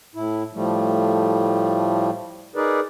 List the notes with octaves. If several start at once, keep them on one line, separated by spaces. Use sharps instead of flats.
A2 E4
A2 F3 G3 A3
D#4 G#4 A#4 B4 D5